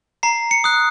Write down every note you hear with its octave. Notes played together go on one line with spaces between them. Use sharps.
A#5 C7
C#7
D#6 F#6